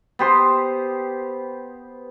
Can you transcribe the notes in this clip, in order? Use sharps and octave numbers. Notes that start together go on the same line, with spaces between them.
B3 G4 C5